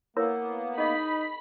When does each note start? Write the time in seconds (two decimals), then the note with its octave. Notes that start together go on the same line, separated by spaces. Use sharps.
0.17 A#3 B3 E4 A#4 C#5
0.78 D#4 G#4 D#5 B5